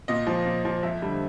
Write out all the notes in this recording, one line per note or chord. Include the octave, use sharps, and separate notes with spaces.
A#2 D#5
F3
A#2
F3
F2 E5
D3 G3